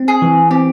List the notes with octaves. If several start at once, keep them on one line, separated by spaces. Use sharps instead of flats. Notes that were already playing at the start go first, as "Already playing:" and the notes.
Already playing: C4
G#4
E3
C4 G4